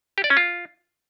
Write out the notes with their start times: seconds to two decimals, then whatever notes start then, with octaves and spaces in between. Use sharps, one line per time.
0.18 G4
0.24 D5
0.30 C#4
0.37 F4